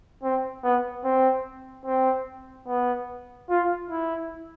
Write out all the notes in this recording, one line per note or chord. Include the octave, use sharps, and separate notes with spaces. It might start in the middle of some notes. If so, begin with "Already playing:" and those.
C4
B3
C4
C4
B3
F4
E4